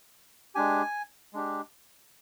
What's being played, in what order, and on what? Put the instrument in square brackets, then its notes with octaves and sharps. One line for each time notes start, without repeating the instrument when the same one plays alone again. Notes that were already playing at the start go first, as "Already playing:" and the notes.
[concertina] G#3 D4 G4 G#5
G#3 D4 G4